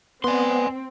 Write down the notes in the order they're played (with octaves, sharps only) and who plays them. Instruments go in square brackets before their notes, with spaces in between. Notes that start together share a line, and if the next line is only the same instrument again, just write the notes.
[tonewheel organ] B3 [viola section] C4 [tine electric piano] B4 D5 [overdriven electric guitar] G#5 C6